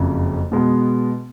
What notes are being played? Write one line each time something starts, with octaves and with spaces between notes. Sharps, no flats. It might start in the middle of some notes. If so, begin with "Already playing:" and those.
Already playing: F#1 F2 C#3
B2 G#3 B3